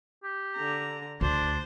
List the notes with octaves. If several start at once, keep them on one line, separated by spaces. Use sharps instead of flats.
G4
D3 A#5
D2 D4 C5